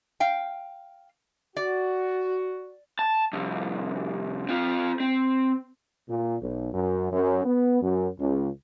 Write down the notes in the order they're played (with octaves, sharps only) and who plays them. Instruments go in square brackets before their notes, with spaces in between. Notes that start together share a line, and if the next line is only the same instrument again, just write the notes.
[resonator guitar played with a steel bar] F5 G5
[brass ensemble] F#4 [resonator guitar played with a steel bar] D5
[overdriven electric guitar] A5
C2 F2
C4 F4
C4
[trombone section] A#2
B1
F#2
F#2
B3
F#2
C#2